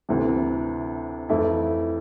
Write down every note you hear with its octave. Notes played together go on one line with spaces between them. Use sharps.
D2 C3 E3
F2 E3 A3 E4